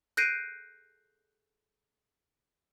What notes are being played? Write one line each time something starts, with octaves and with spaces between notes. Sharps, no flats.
F#6 G6 A#6 C7 D7 D#7